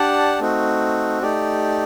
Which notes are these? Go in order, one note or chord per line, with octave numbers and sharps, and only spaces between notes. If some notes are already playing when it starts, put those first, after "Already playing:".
Already playing: D4 G4 D5 F#5 A5
A3 C4 D#4 F#4
A3 D#4 G4 D5